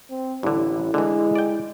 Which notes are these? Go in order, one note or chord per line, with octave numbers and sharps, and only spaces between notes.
C4
A1 G2 D3 E4
D3 E3 G#3
D5 G5